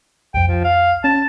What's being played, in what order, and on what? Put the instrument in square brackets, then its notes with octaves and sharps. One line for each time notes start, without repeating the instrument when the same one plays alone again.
[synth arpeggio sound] C2 F2 [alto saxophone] G5
[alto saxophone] F3
F5
[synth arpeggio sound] C#4 [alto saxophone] A5